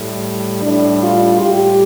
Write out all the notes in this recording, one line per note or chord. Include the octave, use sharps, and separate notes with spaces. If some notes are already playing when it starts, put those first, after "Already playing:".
Already playing: A2 G3
A2 G3 D4
F4
A2 G3 G4